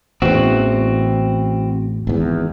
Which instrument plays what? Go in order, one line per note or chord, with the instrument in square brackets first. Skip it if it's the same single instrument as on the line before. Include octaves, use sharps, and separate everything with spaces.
[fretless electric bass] A1 E2 [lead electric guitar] C4 F#4
[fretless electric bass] G#1 E2